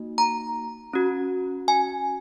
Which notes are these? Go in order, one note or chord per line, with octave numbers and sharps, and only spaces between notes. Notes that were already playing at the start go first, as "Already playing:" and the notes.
Already playing: A#3 D#4 F#4
A#5
C#4 F#4
G#5